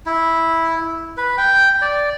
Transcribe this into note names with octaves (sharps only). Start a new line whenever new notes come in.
E4
B4
G5
D5